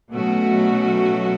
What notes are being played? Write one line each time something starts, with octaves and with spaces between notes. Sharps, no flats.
B2 F#3 A3 C#4 F#4